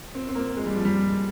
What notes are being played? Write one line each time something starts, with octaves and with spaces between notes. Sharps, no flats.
C4
C4
A#3
G#3
G3
F3
G3